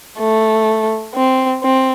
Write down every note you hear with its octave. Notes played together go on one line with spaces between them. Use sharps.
A3
C4
C4